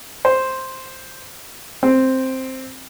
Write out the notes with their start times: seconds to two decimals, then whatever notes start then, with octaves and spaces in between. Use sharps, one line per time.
0.25 C5
1.83 C4